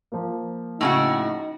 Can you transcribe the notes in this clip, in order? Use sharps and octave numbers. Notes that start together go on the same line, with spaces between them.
F3 A#3
A2 C#3 D#4 F#4